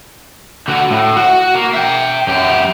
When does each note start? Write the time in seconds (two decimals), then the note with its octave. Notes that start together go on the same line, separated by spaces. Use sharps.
0.68 D3 F#4
0.91 A2
1.17 F#4
1.55 A#3
1.74 E5 G5
2.27 F#2 G4